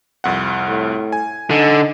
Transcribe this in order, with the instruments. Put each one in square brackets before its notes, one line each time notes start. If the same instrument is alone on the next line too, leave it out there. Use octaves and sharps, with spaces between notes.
[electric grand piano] C2 F2 F#5
[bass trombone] A2
[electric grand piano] G#5
[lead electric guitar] D3 [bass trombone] D#4